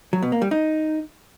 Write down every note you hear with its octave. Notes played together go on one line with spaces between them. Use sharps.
F#3
B2
A#3
G3
D#4